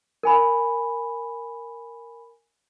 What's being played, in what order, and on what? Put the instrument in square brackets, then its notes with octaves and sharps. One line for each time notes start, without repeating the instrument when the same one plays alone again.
[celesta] A#4 G#5 B5